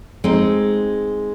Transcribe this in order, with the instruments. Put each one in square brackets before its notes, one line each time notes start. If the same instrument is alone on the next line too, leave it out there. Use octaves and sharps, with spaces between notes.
[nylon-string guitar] G#3 C4 D#4